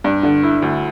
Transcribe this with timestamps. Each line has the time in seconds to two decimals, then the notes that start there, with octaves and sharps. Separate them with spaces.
0.04 G2
0.23 D3
0.43 E4
0.62 D2